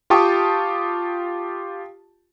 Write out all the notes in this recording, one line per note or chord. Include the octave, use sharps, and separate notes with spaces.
F4 G4 G5 A5 C#6 D#6